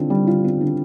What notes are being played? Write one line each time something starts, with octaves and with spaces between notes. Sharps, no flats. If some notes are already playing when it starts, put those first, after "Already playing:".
Already playing: D3 C4 F4
G3
F4
C4
D3